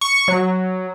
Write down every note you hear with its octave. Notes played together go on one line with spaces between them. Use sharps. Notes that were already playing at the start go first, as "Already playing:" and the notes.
C#6
F#3